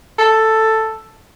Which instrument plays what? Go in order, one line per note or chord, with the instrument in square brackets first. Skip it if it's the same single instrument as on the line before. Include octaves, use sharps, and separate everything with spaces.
[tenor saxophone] A4